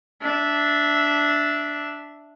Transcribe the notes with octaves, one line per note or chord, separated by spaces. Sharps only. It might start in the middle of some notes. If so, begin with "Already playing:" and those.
D4 E5